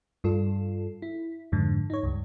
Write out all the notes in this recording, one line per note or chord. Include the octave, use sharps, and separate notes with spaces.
G2 F4 A4
E4
F2 G#2 D3
D#4 C#5
C#2 G2